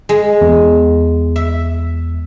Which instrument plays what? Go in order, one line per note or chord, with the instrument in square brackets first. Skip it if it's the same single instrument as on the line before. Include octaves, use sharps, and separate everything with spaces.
[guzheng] G#3
[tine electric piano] E2
[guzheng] E5